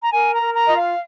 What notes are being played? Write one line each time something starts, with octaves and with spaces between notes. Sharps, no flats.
A#5
A#4 G#5
A#5
A#4
A#5
F4 D#5
F5